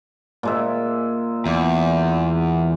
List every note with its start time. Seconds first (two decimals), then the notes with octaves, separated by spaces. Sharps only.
0.43 A#2 G#3 E5
1.46 E2